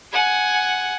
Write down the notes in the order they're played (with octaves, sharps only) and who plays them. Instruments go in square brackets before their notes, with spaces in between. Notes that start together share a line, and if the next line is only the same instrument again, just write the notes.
[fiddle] F#5 G#5